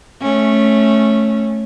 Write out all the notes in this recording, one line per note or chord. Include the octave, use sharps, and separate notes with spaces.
A3 C#4